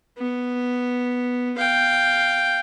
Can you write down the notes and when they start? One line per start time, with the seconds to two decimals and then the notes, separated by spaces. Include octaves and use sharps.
0.18 B3
1.58 F5 G5